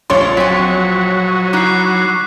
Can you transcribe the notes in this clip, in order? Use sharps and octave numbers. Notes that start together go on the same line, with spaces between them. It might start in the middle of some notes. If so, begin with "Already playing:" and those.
A#1 A3 D4 F4 C#5 C6
F#3 C4 G#5 B6
C#6
D#4 E4 D6 F#6 C7